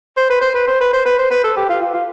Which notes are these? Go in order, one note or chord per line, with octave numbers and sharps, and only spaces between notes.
C5
B4
C5
B4
C5
B4
C5
B4
C5
B4
A4
G4
F4
F4
F4